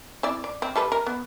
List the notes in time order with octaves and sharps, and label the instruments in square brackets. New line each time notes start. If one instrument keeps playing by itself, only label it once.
[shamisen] C4 E4 D5
D5
C4
G3 A4 B4
A#4
B3